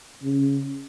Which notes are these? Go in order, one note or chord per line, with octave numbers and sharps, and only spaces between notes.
C#3